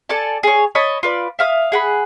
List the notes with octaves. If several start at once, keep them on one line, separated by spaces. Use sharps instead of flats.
A4 D5 G#5 A5
G#4 C#5
C#5 D#5 A5 B5
F4 B4 D5
E5 F5 D#6
G#4 F#5 B5